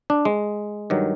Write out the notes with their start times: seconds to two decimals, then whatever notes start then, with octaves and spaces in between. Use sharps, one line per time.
0.10 D4
0.25 G#3
0.90 G2 D#3 F#3